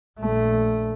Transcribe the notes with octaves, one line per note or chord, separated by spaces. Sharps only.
A#1 A3